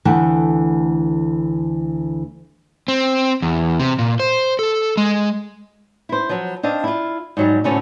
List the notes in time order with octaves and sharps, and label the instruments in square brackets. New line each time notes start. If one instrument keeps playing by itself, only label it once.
[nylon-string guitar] D2 E3 A3 F#5 G5
[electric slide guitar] C4
E2
C3
A#2
C5
A4
G#3
[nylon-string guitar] E4 C5
F3 F#3
C4 D4 D#5 F5
E4 F4
G#2 F#3 G3
D2 A2 C3 C#4 F#4 A4